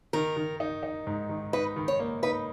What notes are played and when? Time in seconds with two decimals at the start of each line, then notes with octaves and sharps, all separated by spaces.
0.13 D#3 A#4
0.36 D#3
0.60 D#4
0.83 D#4
1.07 G#2
1.29 D#3
1.53 D#4 B4
1.76 D#3
1.88 C#5
1.99 A#3
2.23 D#4 B4